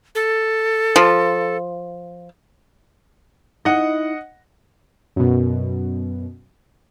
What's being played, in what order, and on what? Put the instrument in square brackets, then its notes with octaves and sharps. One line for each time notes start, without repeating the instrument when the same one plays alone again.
[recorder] A4
[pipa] F3
[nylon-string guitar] D#4 E4 [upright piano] D#5 F#5
[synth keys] F#2 B2